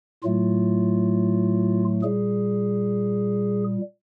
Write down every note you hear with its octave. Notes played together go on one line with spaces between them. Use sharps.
A2 F#3 A3 F4
A#2 G3 G#4